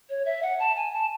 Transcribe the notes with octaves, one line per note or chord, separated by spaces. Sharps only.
C#5
E5
F#5
A5
G#5
A5